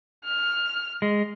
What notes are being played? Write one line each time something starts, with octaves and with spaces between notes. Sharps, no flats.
F6
G#3